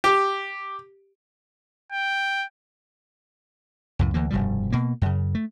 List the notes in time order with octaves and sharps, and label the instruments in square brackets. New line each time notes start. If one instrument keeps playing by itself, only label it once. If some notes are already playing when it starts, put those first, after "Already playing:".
[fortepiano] G4
[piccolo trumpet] G5
[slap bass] C#2 F#2 A2
D2 E3 A#3
F1 G2 B2 G3
B2 A#3
F#2 C#3
A3